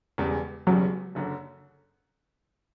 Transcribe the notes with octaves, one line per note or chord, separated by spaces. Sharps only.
E1 E2 C#3 G3
E1 E2 C#3 F#3 G3
F#1 F#2 D3